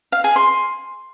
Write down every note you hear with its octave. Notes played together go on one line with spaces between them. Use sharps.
F5
G#4
C6